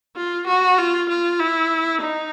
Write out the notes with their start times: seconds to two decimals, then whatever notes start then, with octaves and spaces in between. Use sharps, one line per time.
0.16 F4
0.47 F#4
0.78 F4
1.09 F4
1.39 E4
2.01 D#4